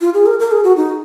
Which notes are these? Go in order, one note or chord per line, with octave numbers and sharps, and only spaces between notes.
F4
G#4
A#4
A#4
G#4
F#4
D#4